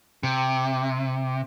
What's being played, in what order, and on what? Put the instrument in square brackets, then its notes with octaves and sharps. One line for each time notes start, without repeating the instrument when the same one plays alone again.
[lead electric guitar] C3